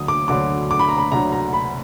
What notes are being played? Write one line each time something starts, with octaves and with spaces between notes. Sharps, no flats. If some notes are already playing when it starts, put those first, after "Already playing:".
Already playing: D2 D3 F#3 D#6
D6
D2 D3 F#3 D6
D6
B5
A#5
B5
D2 D3 F#3 A#5
A#5
B5